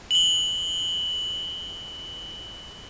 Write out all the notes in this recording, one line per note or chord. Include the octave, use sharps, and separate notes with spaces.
F#7 G7